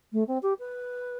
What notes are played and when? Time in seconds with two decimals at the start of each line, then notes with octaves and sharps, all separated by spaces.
0.12 A3
0.27 C4
0.42 G4
0.59 B4